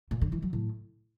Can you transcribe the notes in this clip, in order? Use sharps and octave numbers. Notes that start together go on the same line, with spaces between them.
A#2
D3
E3
F#3
A2